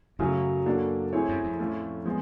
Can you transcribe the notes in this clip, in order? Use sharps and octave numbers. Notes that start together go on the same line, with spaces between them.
F#2 C#3 F#3 A3 C#4
A#3 D4 F#4 A4
A3 C4 E4 G#4 C#5
F#2
F2
A2 F3 A3 C#4
F3 G#3 B3